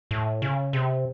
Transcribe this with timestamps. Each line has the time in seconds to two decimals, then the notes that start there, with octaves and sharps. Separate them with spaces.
0.11 A2
0.42 C#3
0.73 C3